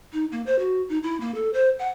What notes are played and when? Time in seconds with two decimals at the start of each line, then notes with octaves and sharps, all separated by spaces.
0.13 D#4
0.32 A#3
0.46 C5
0.59 F#4
0.89 D#4
1.03 E4
1.20 A#3
1.35 A4
1.54 C5
1.79 F#5